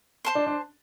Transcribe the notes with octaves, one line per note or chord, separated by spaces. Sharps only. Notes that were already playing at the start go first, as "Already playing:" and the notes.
C5 A5 C6
D4
D4